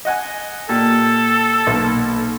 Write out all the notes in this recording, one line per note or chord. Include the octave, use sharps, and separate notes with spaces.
D#5 F#5 G#5
A#2 G4 A4
B1 A#3